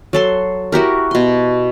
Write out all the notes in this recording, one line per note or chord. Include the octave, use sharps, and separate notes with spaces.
F#3 A4 C6
E4 F#4 G4 A#4
B2 C6